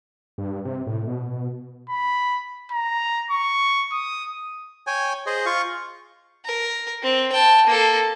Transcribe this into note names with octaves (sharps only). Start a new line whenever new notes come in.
G2
C3
A2
B2
B5
A#5
C#6
D#6
C#5 G5 G#5
G#4 C5 D#5
F4 F5 C#6
A#4
C4
G5 A5
A#3 A4